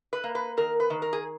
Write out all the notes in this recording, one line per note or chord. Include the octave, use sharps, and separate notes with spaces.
B4
A#3
B4
D#3 A#4
B4
D#3
A#4
G#4